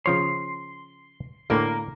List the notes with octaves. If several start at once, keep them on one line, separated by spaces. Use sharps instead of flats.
C#3 F3 C#5 C6
A2 D3 A#3 A#4